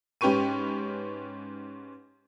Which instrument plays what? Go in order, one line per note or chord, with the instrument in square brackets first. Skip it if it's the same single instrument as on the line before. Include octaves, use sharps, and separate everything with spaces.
[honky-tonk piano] G#2 C#4 G4 B4 C#6 D#7